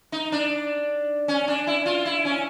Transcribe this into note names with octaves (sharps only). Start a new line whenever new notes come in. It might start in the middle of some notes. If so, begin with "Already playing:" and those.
D#4
D4
C#4
D4
E4
F4
E4
C#4